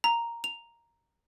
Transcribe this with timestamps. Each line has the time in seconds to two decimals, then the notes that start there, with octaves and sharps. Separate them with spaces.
0.04 A#5
0.44 F7